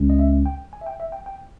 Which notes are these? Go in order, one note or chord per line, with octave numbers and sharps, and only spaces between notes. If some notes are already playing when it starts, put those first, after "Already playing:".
Already playing: C#2 C#3 G#3 C#4
D#5
E5
G5
G#5
E5
G5
E5
G5
G5